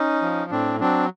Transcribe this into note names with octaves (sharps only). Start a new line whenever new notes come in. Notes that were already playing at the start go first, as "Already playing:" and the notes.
Already playing: C#4 D#4
F3
A2 C4 D4
F#3 C4 D4